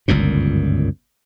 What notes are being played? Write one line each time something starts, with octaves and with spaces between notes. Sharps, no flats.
G1 C#2 F#2 A#2